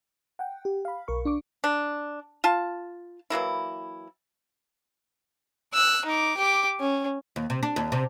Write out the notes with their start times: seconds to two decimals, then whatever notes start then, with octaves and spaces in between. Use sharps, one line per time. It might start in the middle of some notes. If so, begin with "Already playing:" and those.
0.39 F#5 G5
0.65 G4
0.85 F5 B5
1.08 B1 A#4 C#6
1.25 D4 C#6 D6
1.64 D4
2.44 F4 A5
3.30 E3 F#3 A#3 E4
5.74 E6 F#6
6.06 D#4 D6
6.37 G4 D6
6.80 C#4
7.36 D#2
7.50 C3
7.63 D4
7.76 D#2
7.92 C3